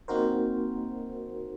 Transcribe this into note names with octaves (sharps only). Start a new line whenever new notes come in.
A#3 C4 D#4 F#4 A#4 C5